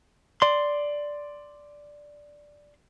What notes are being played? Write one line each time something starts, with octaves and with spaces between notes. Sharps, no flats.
D5 C6